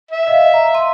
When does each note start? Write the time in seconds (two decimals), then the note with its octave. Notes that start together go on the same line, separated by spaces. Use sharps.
0.11 E5
0.27 D#5 F5
0.54 A#5
0.74 C6 D#7